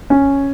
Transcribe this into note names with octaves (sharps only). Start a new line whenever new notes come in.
C#4